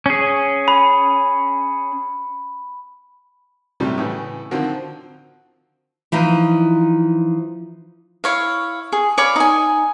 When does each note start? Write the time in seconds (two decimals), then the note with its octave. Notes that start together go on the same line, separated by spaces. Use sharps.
0.06 C#4 G#4
0.68 B5
3.80 A2 C3 F#3 G3 A3
3.98 A2 C#3 E3
4.51 D3 D#3 F3 C4 F#4 A#4
6.12 E3 F3 D#4 F4
8.24 E4 C#5 F5
8.92 G#4
9.18 C#5 D5 F5 B5
9.36 D#4 G#5